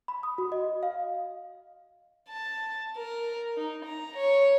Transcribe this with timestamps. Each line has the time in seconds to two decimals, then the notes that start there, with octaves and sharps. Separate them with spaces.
0.08 B5
0.23 D#6
0.38 F#4
0.52 D#5
0.83 F5
2.29 A5
2.97 A#4
3.57 D#4
3.85 A#5
4.17 C#5